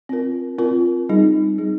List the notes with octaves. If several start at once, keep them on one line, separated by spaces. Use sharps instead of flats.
C4 F4 A#4
C4 F4 A#4
G3 C4 D#4 G#4
G3 C4 D#4 G#4